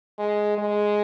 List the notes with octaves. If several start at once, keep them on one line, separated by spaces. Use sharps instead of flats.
G#3
G#3